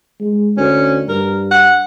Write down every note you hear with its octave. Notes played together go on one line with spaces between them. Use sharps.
G#3
D2 C#4
G2 A#4
F#5